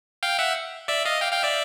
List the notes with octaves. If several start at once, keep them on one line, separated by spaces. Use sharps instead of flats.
F5 G5
E5 F#5
D5 E5
D#5 F5
F5 G5
F5 G5
D5 E5